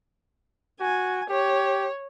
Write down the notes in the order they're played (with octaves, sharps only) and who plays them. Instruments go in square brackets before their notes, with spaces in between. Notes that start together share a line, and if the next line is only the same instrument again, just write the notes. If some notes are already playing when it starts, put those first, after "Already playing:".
[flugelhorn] F#4 [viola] G#5
[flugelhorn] G4 [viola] C#5